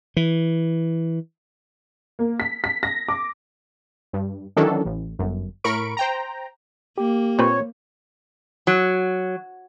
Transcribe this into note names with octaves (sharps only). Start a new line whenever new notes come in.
E3
A#3
B6
B6
A#6
D6
G2
D#3 E3 F#3 C#4 D4 A4
A1
G1 F#2
A2 A#4 B5 C#6 D7
C5 G5 A#5
A#3 G4
A#2 C4 B4 C#5
F#3